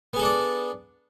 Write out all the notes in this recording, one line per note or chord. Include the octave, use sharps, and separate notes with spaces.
B3 D4 G#4 A4 D5